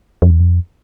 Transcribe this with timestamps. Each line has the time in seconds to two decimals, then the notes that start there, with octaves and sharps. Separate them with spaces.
0.22 F2
0.30 E2
0.40 F2